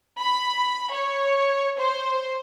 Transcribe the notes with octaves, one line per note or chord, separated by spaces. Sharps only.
B5
C#5
C5